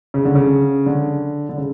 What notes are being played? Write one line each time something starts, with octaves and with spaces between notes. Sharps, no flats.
C#3
D3
C#3
D3
D3
C#3